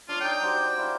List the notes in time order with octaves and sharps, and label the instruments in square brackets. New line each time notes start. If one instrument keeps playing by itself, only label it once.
[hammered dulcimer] D4 C#5 [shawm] F4
[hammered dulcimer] D#4 A#4 D5 [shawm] G5
[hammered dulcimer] F#4 G4 C5
D5
E4 F5